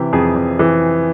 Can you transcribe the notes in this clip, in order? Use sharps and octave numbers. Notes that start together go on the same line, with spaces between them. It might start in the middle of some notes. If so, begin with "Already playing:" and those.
Already playing: C3 E3 G4
F2 G#4
F2
E3